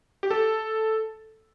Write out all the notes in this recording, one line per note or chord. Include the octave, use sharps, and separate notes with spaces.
G4
A4